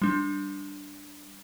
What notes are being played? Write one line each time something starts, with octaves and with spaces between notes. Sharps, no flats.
G3 D4